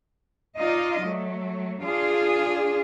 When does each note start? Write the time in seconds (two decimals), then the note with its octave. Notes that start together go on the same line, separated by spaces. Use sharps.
0.58 D#4 F4 D5 D#5
1.02 F#3 A3
1.82 D4 F4 G#4